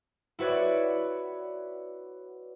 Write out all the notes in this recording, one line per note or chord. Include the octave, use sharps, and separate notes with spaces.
E4 F#4 B4 C#5 D5